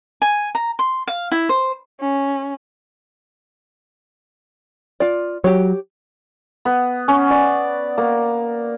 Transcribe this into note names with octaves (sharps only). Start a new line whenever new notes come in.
G#5
A#5
C6
F5
E4
C5
C#4
F4 D5
F#3 G4 C#5
B3
C#4
D5
A#3